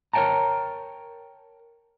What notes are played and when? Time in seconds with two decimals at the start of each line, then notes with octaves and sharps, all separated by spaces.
0.13 A#4 C#5 D5 G5 A5 A#5